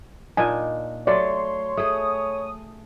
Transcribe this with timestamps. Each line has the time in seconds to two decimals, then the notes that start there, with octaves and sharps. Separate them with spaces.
0.37 A#2 D4 D#4 G#5
1.07 F#3 A3 C#5 D5 C6
1.77 A3 G#4 D#6